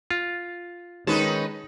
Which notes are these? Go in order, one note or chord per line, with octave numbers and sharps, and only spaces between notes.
F4
D#3 G#3 C#4 D#4 B4 A5